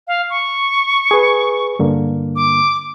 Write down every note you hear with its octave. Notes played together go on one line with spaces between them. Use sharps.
F5
C#6
G#4 B4
G2 D3 A#3
D6